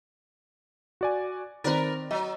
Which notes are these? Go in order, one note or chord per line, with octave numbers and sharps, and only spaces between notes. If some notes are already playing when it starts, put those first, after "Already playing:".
F#4 D5 G#5
D#3 C4 A#4 B4 D5 A6
F#3 D#5